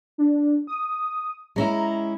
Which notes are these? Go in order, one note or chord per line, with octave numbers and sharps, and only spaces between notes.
D4
D#6
G#3 C#4 E4 A#5